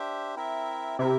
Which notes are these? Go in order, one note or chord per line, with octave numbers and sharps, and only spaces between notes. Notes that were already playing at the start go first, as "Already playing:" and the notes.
Already playing: D4 G4 C5 E5
C4 E4 A#4 E5
C3 C4 E4 A#4 E5